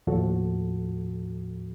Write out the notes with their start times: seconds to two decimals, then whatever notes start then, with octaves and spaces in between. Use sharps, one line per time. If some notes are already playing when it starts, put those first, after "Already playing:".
0.07 D#2 A2 F3 F#4 A4